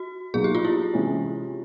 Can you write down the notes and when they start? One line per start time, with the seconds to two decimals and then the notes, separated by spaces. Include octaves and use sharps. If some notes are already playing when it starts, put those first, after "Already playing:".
Already playing: F#4
0.34 B2 F#3 A#3 D#4 G#4
0.44 G4
0.55 F4
0.65 E4
0.94 C3 E3 G#3 C#4